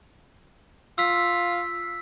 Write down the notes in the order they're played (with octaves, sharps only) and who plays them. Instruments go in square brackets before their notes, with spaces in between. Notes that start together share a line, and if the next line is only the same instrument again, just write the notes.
[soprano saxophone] F4 [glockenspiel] E6 B6